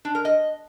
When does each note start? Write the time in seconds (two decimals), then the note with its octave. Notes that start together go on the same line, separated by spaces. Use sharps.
0.05 D4
0.15 A#4
0.25 D#5